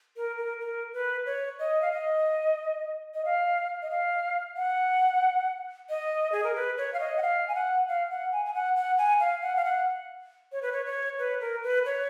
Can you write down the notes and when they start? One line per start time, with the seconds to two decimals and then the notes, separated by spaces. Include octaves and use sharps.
0.16 A#4
0.38 A#4
0.60 A#4
0.93 B4
1.26 C#5
1.59 D#5
1.82 F5
1.92 D#5
3.14 D#5
3.25 F5
3.82 D#5
3.91 F5
4.57 F#5
5.90 D#5
6.32 G#4
6.44 A#4
6.56 B4
6.78 C#5
6.93 F5
7.00 D#5
7.17 F#5
7.22 F5
7.48 G#5
7.55 F#5
7.88 F5
8.10 F#5
8.32 G#5
8.45 G#5
8.54 F#5
8.76 F#5
8.98 G#5
9.20 F5
9.42 F#5
9.56 F5
9.65 F#5
10.52 C#5
10.62 B4
10.72 C#5
10.86 C#5
11.19 B4
11.41 A#4
11.63 B4
11.86 C#5